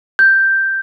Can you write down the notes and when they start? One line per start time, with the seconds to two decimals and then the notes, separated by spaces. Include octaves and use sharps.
0.19 G6